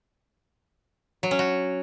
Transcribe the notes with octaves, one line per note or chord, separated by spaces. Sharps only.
F#3
C#4
F#4